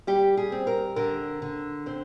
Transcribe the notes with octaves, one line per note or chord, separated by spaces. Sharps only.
G3 G4
G#4
C4
A#4
D3 A#4
D3
C4 C5